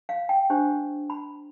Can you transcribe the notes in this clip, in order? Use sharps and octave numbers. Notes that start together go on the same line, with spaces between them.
F5
G5
D4 G4 C5
B5